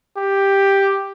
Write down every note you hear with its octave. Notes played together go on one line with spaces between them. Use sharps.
G4